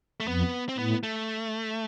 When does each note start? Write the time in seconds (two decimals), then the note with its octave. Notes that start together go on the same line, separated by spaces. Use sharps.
0.20 A3
0.28 F2 B3
0.69 C4
0.78 A2 B3
1.03 A3